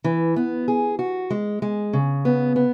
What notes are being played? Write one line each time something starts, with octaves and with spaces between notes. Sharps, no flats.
E3
B3
G#4
F#4
G#3
G#3
C#3
B3
B3